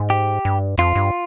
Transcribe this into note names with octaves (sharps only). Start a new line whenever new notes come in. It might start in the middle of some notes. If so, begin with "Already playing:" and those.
Already playing: G#2
G4
G2
F2 F4
G2